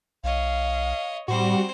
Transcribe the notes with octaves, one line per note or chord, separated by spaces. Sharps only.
B1 C#5 D#5 F5
A2 G3 C4 F#4 C5